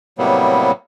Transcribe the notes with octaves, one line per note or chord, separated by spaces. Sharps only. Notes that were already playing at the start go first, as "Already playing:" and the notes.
A2 C3 F#3 G3 A#3 B3